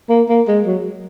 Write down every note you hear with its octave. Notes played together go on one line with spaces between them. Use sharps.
A#3
A#3
G#3
F#3